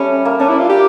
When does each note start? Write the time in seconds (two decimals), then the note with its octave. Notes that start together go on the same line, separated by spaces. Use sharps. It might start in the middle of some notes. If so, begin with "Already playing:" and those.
Already playing: G3 A3 C#4
0.25 A#3
0.40 C#4 D4
0.49 E4
0.59 F4
0.69 G4